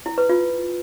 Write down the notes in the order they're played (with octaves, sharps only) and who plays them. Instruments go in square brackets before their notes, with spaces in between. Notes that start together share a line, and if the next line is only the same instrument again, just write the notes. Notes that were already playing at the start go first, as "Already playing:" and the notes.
[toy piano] E4
B4
F4